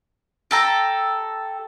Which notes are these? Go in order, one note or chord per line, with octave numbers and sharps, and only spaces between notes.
G4 A4 A#5